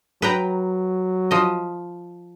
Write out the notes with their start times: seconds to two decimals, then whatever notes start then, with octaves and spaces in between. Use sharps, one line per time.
0.22 F#3 B4 G5 A#5
1.31 F3 D#5